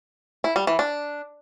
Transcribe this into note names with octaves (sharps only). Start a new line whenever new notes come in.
E4
G3
E3
D4